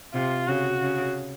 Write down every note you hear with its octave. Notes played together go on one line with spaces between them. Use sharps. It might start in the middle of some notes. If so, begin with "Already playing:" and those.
C3 F4
C#3 F#4
C#3